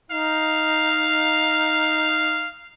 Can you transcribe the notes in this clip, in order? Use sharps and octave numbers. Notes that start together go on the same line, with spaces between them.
D#4 F5